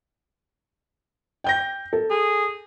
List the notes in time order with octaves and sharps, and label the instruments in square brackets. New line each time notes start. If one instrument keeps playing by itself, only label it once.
[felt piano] G5 G6 A#6
A4
[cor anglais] G#4